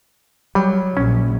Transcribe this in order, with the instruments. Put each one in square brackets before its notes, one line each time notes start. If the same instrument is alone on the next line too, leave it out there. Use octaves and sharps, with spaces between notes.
[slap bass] F#3 [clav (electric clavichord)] G3
[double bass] A#1 [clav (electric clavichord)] C#4